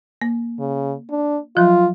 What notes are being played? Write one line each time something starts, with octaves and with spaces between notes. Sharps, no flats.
A#3
C#3
D4
F3 F#3 F4